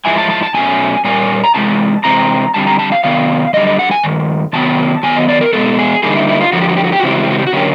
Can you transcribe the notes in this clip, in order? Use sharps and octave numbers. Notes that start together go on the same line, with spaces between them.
G#2 F3 G#3 E4 G#5
A5
A5
A5
B2 F#3 A3 C#4 G#5
A#2 G3 A#3 C#4 G#5
A#5
E2 C3 E3 G#3 A5
C3 E3 G#3 C4 A#5
G2 D3 G3 C4 A5
A#5
A5
F5
C3 D#3 F#3 B3 F5
F#2 D3 G3 D#5
D#5
F#5
G#5
G2 D#3
C3 D#3 F#3 B3 A5
D#3 F#3 B3 G#5
D#5
D5
A#4
B2 G#3 B3 A4
G#4
D3 G3 A#3 D#4 G#4
E4
E4
F4
F2 D3 F3 F#4
G4
F#4
G4
F#4
G4
F#4
C#3 E3 G#3 C4 E4 G4
F#4
G4
F#4
G4
F#4
D3 F#3 A#3 C#4 G4